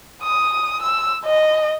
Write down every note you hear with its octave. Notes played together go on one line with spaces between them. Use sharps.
D#6
E6
D#5